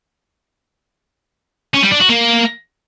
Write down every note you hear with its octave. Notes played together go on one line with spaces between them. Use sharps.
C#4
G3
D4
F#4
A#3